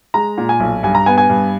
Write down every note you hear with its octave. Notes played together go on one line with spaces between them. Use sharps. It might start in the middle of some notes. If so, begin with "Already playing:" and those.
G#3 A#5
A#2
G#5
B1
G2 G#5
A#5
B3 G#5
G#5
G2